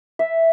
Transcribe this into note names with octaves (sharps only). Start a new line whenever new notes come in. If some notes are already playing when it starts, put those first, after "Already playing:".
E5